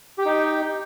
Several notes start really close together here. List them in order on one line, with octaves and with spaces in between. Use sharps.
G4 G5 D#4